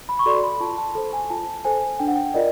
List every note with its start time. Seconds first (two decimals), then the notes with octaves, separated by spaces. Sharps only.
0.09 B5
0.19 C#6
0.26 F#4 A4 D5 C6
0.44 B5
0.61 F4 A5
0.78 A5
0.95 A4 C5
1.13 G#5
1.30 F4 A5
1.65 A4 C5 G#5
1.99 D4 G5
2.08 F#5
2.16 G5
2.34 F4 A#4 D5 D#5